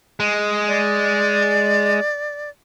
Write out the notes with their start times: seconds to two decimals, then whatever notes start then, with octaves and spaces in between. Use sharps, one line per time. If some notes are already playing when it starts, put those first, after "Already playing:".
0.20 G#3
0.67 D5